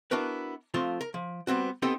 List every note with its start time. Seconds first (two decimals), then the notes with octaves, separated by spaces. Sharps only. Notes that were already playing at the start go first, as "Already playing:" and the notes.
0.11 B3 D4 E4 F#4 A#4 B4
0.74 F3 A3 C4 F4
1.01 A#4
1.14 F3
1.47 G3 B3 C4 F#4
1.82 B3 C4 D#4 G4 A4 D#5